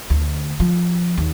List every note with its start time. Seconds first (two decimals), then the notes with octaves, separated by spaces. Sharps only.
0.10 D2
0.60 F3
1.18 D#2